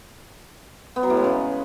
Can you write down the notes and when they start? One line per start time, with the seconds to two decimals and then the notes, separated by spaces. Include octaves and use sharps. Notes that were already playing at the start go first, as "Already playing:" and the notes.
0.96 B3
1.03 F#3
1.10 A2
1.17 G#3
1.24 C#3